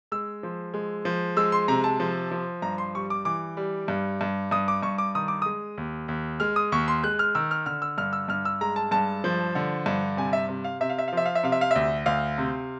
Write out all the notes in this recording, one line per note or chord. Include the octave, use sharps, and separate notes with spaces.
G#3 E6
F3
G#3
F3
G#3 E6
C6
C3 A#5
A5
F3
F3
G2 A#5
C6
G3 C#6
D6
E3 D6
G3
G2
G2
G2 D#6
D6
G2 C#6
D6
D#3 D#6
D6
G#3 D#6
D#2
D#2
G#3 F6
D#6
D#2 C#6
C6
G#3 F#6
F6
D#3 E6
F6
D3 F6
E6
G2 F6
E6
G2 F6
E6
G#3 A#5
A5
G2 A5
F3
D3
G2
C3 G#5
E5
C3
F5
C3 E5
F5
E5
F5
F3 E5
F5
E5
C3 F5
E5
F5
D2 E5
D2 F5
C3